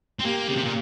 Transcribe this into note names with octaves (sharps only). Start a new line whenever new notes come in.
C4
A#3 G4
C#3
C3
A#2